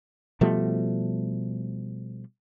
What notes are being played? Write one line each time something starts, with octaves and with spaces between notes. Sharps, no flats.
B2 F3 G3 A3